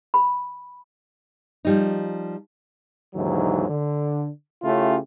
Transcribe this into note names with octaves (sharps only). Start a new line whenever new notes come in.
B5
F3 G3 D#4
D#2 G#2 D3 E3 F#3
D3
C#3 A3 C#4 E4 F4 G4